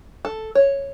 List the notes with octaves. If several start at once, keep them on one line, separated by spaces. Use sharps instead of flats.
A4
C#5